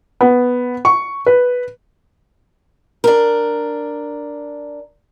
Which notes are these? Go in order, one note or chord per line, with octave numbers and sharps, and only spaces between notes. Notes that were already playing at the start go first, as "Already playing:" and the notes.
B3
C#6
B4
D4 A#4